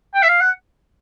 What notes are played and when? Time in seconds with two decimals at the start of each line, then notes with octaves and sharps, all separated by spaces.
0.15 G5
0.23 E5
0.28 F5
0.41 F#5